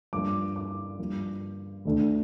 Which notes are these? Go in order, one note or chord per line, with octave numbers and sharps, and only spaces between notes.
G2 F3 A#3 D6
D6
G2 F3 A#3
D2 D3 A3